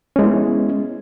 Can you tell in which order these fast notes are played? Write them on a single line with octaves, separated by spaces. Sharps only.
C#4 G#3 E4 B3